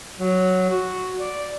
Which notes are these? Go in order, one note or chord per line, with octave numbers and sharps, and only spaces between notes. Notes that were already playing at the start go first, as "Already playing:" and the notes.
F#3
F#4
D5